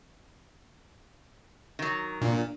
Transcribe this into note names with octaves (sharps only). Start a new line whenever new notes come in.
D#3 F#3
A#2 D4